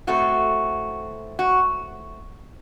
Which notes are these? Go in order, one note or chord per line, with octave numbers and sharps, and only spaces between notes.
A2 A3 C4 F#4
F#4